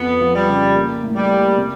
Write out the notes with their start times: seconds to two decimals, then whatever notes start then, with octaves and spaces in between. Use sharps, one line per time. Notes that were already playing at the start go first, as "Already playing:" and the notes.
Already playing: F2 B3
0.21 F3
0.35 G3
0.48 C#3
0.76 A#3
1.03 A2
1.16 G3
1.30 A#3
1.57 C3